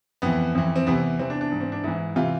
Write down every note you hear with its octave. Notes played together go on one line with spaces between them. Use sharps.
F2 E3 B3
F2 E3
C4
E2 C3 E3 B3
E2 C3 E3 C4
D4
D4
G#2 E3
C4
D4
G#2 E3 E4
C3 E3 F4